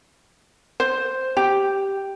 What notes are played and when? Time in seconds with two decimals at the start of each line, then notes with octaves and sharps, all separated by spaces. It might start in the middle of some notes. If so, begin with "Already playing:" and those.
0.80 C5
1.37 G4